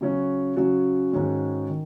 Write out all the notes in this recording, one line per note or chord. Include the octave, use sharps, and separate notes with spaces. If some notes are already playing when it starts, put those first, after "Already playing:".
C#3 F#3 C#4 F#4
C#3 F#3 C#4 F#4
G#2 D#3 G#3 C#4 F#4
D#3